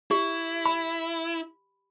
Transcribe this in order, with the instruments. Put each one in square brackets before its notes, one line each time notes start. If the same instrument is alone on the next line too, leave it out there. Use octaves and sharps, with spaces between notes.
[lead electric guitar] E4 [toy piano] G4
[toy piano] B5